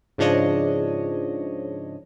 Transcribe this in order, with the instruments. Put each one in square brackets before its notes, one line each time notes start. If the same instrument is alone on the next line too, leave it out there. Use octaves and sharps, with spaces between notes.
[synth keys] G#2 C#3 F3 D4 C#5 D#5